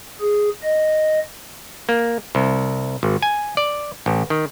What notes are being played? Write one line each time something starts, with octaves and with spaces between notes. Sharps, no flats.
G#4
D#5
A#3
C2
G#1
G#5
D5
A1
D#3